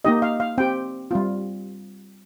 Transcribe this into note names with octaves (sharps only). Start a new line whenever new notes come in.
A#3 D#4 G4 D#5
F5
F5
C4 G4 G5
G3 C4 F4